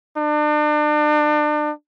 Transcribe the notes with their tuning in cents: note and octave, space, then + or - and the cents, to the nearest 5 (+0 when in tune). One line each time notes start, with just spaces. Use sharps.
D4 +35